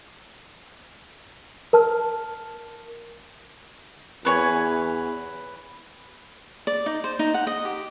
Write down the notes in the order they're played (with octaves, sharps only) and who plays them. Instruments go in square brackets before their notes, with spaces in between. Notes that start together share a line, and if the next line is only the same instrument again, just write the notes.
[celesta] A#4 A5 F6
[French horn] E2 [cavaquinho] B4 C#5 G#5
[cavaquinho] D5
D#4
C5
D#4
F#5
D#5
G4